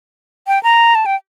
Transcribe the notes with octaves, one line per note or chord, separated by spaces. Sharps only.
G5
A#5
A5
G5